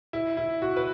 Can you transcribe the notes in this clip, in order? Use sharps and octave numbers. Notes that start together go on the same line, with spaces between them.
E4
E4
F#4
B4